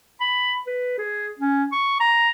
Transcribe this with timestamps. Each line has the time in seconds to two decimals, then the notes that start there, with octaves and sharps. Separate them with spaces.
0.21 B5
0.67 B4
0.98 G#4
1.39 C#4
1.72 C#6
2.00 A#5